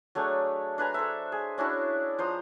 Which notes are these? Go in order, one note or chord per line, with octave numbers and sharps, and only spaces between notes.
F#3 A3 D4 G#4
D4 B4 G#5 A#5
A4 C5 E5
G#4
C#4 D4 E4 F#4
F3 C5 A#5 D#6